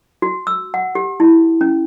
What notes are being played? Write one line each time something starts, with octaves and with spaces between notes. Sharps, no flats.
F#4
E6
F#5
G4
E4
C#4